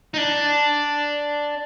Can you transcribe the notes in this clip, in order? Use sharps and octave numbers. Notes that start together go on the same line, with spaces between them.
D#4
D4